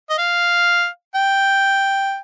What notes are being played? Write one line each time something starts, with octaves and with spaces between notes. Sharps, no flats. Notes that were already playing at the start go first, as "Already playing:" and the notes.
D#5
F5
G5